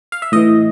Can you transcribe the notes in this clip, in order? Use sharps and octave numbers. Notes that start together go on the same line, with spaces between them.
F5
E5
A2 E3 D#5